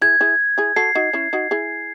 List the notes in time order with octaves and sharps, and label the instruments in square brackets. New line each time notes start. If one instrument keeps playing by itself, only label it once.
[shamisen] E4 G#4 [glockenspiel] G#6
[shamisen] E4 G#4
E4 G#4
[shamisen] F#4 A4 [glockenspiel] C7
[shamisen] D#4 F#4
C#4 E4
D#4 F#4
E4 G#4